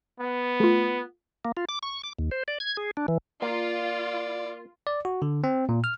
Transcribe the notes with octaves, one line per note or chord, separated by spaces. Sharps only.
B3
A3 F4
A#3
F4
D6
C#6
D6
D#2
C5
D5
G#6
G#4
D4
E3
A#3 F4 D5
D5
F#4
D3
C4
A#2
F6